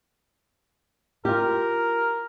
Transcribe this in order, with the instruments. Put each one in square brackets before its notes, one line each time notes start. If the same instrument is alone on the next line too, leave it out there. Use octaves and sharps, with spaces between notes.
[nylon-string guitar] F4 G4 [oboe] A#4